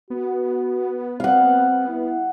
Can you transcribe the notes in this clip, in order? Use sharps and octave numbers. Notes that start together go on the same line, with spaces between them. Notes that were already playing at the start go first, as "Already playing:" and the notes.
B3 F#4
C4 F5 F#5
E4